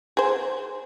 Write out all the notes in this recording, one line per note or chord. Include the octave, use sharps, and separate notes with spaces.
G#4 C5